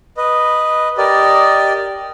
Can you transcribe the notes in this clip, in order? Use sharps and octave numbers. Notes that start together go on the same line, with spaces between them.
B4 D#5
G4 A#4 D5 D#5